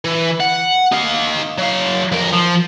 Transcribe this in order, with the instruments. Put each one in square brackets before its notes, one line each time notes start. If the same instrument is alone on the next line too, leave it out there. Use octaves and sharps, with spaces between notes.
[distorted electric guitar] E3
F#5
D#4 F5
F#3 F5
F2 A#4
F3